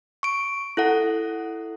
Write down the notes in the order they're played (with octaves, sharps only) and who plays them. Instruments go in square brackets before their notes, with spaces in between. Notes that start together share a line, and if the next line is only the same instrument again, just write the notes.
[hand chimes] C#6 D7
E4 A4 F#5